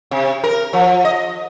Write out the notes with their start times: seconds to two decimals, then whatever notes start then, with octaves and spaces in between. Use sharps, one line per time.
0.11 C3
0.44 A#4
0.73 F3
1.05 D#5